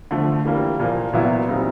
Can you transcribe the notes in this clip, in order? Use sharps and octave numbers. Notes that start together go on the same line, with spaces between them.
D3 F3 A3
E3 G3 A#3
A#2 F3 A#3
A#2 F#3 B3 E4
A#2 G3 C4 D#4